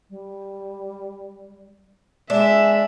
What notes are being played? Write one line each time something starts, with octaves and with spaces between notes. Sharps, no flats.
G3
G#3 D4 E5